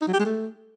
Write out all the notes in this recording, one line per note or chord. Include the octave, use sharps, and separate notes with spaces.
D#4
F#3
G4
G#3
A3